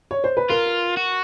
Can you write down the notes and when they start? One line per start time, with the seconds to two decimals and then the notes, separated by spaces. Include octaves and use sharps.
0.11 C#5
0.24 C5
0.37 B4
0.50 F4 A#4
0.97 F#4